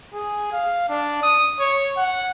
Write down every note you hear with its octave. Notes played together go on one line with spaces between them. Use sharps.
G#4
F5
D4
D#6
C#5
F#5